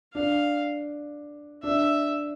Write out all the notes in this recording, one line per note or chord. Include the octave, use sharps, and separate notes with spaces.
D4 F5
D4 E5